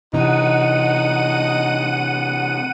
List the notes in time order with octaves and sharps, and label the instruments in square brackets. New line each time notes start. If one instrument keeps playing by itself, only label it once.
[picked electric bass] C3 E3 [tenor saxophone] D#4 [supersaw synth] F#5 D#7